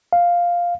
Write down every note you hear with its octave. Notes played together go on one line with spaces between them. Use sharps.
F5